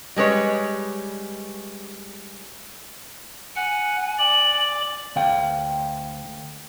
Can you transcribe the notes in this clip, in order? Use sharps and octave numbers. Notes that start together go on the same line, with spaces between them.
G3 G#3 B4 C#5
F#5 G#5
D5 F#7
D2 F5 G5